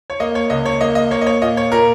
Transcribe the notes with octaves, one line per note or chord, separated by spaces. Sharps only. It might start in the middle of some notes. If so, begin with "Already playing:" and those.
C#5
A#3 D#5
C#5
C#2 D#5
C#5
A#3 D#5
D#5
A#3 C#5
D#5
C#5
A#2 D#5
C#5
A#2 A#4